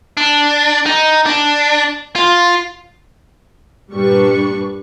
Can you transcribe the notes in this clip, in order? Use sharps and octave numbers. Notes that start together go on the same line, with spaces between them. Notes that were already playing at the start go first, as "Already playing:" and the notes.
D4
D#4
D4
F4
G2 A#2 G3 D4 B4 C#6